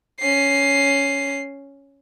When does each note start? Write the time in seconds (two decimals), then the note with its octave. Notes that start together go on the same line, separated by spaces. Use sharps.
0.21 C#4 C7